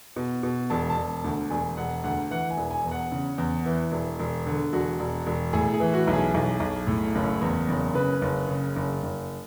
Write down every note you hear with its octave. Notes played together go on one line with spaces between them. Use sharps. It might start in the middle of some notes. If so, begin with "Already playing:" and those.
B2
B2
E1 A5
A5
E1
D2
E1 G#5
E1 F#5
D2 F#5
E3 F#5
G#5
E1
G#5
E2
F#5
C#3
E2
E3
E1
E1
D3
E1 F#4
E1
E1
A2 G#4
G#4
E3
F#4
B1
G#4
B1
B1
A2
F#1
E2
F#1
C#3 B4
F#1
C#3
F#1
F#1